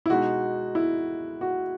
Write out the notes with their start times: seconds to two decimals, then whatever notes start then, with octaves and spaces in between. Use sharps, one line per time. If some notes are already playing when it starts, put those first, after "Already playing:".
0.06 E4
0.10 B2 G#3 D#4 F#4
0.75 E4
1.41 F#4